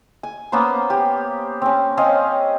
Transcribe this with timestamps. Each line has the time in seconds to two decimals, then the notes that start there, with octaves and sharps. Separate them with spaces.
0.23 G#5
0.52 A#3 B3 C#4 C5
0.90 G4
1.62 C4 C#4
1.97 C4 C#4 D#5 F5